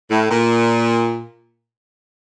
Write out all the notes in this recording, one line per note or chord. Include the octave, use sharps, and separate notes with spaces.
A2
A#2